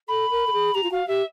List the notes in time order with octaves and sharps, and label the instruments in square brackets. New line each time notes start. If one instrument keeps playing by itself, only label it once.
[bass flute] A4 [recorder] B5
[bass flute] A#4
A4
G#4
[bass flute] G4 [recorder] A#5
[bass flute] F4
[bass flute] F#4 [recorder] F5
[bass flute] G4 [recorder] E5